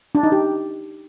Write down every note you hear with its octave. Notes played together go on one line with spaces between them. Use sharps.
D4
D#4
G4